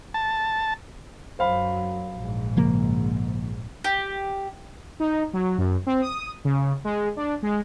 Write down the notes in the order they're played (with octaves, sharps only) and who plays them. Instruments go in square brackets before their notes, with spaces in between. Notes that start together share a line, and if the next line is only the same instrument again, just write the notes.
[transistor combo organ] A5
[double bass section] F#2 F#3 [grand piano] C5 F5 B5
[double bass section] A#1 G#2
[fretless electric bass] C#3 F3 A#3
[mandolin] G4
[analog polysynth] D#4
F#3
F#2
C4
D#6
C#3
G#3
D4
G#3